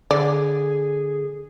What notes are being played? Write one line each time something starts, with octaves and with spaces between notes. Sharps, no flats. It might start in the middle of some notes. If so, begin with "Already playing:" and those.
D3 G#4 D5